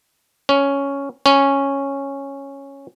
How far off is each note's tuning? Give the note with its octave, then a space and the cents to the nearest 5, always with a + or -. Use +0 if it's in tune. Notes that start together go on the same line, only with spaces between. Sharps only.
C#4 +5
C#4 -5